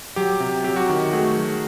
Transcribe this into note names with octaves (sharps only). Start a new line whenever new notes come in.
F#3 G4
C3
F#3 G4
F#4
D#3 G4
A3 F#4 G#4
F#3